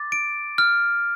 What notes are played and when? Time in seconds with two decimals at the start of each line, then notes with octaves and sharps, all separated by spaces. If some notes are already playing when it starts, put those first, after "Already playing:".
Already playing: D6 A6
0.12 D7
0.58 F6